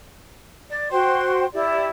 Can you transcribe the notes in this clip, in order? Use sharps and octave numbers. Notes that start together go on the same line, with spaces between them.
D5
F#4 C5 G5 C6
E4 G4 D5